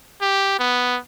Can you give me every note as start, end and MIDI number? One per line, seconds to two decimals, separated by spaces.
0.22 0.58 67
0.59 0.98 59